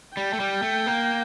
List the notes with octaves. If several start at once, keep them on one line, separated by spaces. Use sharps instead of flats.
G3 G5
A3
G3
A3
A#3